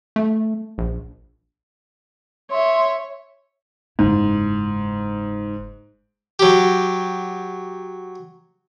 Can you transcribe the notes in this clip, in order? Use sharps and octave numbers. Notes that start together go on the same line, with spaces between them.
A3
A#1
C#5 E5 C6
F#1 G#2 E4
F#3 G4